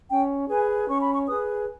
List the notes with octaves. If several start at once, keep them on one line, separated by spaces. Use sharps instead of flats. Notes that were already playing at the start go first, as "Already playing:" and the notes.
C#4 G5
G#4 B4 G#5
C#4 C#6
B5
C#6
G#4 B4 D#6